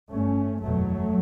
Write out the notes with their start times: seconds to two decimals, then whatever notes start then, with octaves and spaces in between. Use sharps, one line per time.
0.10 G1 G2 A3 C#4
0.61 F#1 E2 B2 F#3 A3